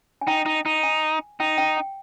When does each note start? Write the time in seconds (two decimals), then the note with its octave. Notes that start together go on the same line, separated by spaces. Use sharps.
0.21 G#5
0.27 D#4 G5
0.46 D#4
0.66 D#4
0.83 G#5
1.40 D#4 G5
1.58 G5
1.77 G5